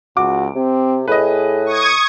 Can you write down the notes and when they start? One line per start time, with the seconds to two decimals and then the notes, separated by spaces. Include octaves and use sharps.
0.17 C#2 F#4 D6
0.55 C3 C4
1.08 A2 G#4 B4 D#5
1.66 C#6 D#6 G#6